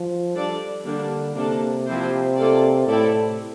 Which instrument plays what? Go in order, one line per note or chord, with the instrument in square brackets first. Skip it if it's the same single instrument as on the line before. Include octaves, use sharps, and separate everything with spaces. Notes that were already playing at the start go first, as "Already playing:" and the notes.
Already playing: [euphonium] F3
[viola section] G3 D4 A4 D5
[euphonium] D3 [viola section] G3 A#3 D4
[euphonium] C3 [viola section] A#3 D4 A4
[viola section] F3 C4 E4 G4 C5
A#3 F4 A4 D5
[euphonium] A2 [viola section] A3 C4 E4 A4 D5